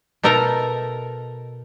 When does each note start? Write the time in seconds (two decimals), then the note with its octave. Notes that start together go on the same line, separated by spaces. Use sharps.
0.23 B2 D#4 A4 A#4 E5 A#5